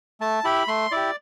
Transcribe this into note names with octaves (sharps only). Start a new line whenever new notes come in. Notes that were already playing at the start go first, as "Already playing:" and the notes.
A3 A5
E4 G4 B5
A3 C6
E4 G4 D5